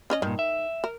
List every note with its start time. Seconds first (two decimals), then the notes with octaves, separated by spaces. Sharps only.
0.10 C#4 C#5 D#5
0.22 G2 A#2 D#3
0.39 E5
0.84 A#4